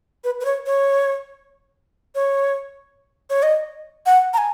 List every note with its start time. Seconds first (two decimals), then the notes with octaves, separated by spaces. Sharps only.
0.24 B4
0.41 B4
0.45 C#5
0.66 C#5
2.15 C#5
3.30 C#5
3.43 D#5
4.06 F#5
4.34 A#5
4.38 G#5